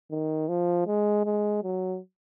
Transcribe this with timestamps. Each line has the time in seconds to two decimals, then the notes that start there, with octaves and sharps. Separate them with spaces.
0.11 D#3
0.48 F3
0.87 G#3
1.25 G#3
1.63 F#3